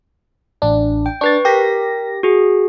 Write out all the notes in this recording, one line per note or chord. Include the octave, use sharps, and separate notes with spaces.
A1 D4
G5
D4 B4 C#6 A6
G4 A#4 A#6 B6
F#4 G#4